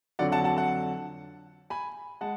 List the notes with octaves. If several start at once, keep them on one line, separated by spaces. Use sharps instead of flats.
F2 D3 F#3 D5 F#5
F#5 A5
F#5 A5
F#5 A5
G#5 B5
G#3 F#5 A5